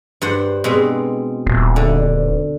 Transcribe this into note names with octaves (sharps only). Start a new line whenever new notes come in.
G2 C5 F#5
B2 G#3 C4
D#1
D3